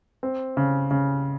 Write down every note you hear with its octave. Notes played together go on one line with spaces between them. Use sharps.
C4
C#3
C#3